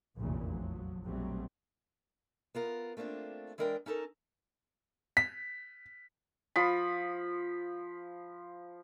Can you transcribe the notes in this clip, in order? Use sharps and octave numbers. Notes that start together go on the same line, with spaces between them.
F1 A#1 E2 A#2 C#3 F3
F3 F#3
A#1 B2 F#3 G3 A3 C4
B3 F4 A#4
A3 A#3 C4 D4 F4
E3 G#3 D4 A#4 D5 G5
C#4 D#4 A4 A#4
B6
F3 B5